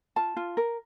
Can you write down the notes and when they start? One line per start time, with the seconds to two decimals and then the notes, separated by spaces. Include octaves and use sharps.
0.16 F4 A5
0.37 F4
0.57 A#4